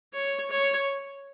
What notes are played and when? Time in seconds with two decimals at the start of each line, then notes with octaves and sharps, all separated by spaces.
0.14 C#5
0.50 C#5